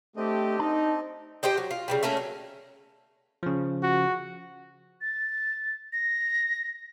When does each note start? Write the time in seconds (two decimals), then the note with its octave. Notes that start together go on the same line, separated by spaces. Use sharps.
0.17 A3 C4 D4 G4 D#5
0.59 D#4 A5
1.43 G4 C5 D#5 G5
1.58 F#3
1.71 F4
1.88 C#3 E3 G3
2.03 A3 A#3 C#4 A#4
2.17 F#3
3.43 C#3 F3
3.83 F#4
5.01 A6
5.93 A#6